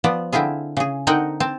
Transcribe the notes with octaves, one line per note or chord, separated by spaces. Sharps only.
F3 B3 D5
D3 C4 E4 F4 G#4
C#3 G#4
D3 C4 D#4 A#4 F#5 G5
C4 A5